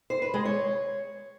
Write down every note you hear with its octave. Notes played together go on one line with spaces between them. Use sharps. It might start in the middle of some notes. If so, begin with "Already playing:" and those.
C5
B4
G#3
C#5